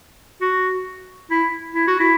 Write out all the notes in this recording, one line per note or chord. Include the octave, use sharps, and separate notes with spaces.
F#4
E4
E4
F#4
E4